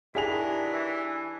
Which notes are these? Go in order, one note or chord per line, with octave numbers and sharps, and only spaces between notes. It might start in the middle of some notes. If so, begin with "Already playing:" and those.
D#3 E3 F#3 D4 E4 G4 G#4 F7
E3